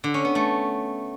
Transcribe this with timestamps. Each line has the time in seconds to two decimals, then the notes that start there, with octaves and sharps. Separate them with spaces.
0.04 D3
0.14 C#4
0.25 B3
0.35 A3